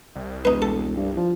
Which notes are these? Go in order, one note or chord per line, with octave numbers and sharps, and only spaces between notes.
C2
E1 D#4 B4
A4
G2
F3